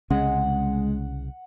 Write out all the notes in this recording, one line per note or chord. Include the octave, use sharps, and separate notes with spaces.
C2 C#3 G#3 C#4 F#5